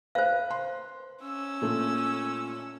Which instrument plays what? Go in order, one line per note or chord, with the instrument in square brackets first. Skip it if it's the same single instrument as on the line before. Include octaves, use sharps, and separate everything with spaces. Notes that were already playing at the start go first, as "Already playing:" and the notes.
[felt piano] B4 [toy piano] C5 F5
[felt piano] C6
[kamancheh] C#4 E6
[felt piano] A#2 A3